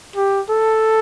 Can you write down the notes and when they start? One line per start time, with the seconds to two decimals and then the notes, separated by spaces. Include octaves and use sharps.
0.16 G4
0.50 A4